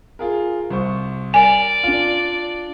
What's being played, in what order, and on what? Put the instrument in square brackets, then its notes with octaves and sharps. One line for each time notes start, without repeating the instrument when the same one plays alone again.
[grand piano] F4 G#4 A#4
C2 C5 C#6
[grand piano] A#4 [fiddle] D5 [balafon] G#5
[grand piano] D4 F4